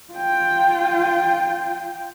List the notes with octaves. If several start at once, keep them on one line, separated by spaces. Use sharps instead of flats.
F4 G5